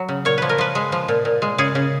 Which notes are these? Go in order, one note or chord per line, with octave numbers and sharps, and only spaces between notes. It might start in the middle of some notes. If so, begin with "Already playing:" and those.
Already playing: F#3
C#3
A#2 C#5
F3 B4
A#4
F3 B4
G#3
F3
A#2
A#2
G#3
C#3 G#4
C#3